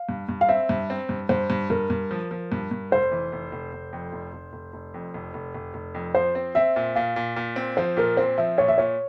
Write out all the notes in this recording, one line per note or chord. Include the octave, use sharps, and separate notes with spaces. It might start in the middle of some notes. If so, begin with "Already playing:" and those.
Already playing: F5
G2
G2
F5
C4 E5
G2
C4
G2
G2 C5
G2
G2 A#4
G2
F3
F3
G2
G2
F1 C5
E3
F1
F1
F1
F2
F1
F1
F1
F1
F2
F1
F1
F1
F1
F2
F3 C5
C4
C4 E5
A#2
A#2 F5
A#2
A#2
C4
F3 C5
A#2 A#4
C4 C5
F3 E5
A#2 C#5
E5
A#2 C#5